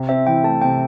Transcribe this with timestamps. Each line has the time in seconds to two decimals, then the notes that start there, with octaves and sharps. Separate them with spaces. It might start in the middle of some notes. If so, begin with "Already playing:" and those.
Already playing: C3
0.09 C4 E5
0.27 E3 G5
0.44 A3 A5
0.62 C3 G5